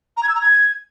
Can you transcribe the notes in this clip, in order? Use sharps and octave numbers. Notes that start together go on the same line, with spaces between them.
A#5
G#6
E6
A#5
G#6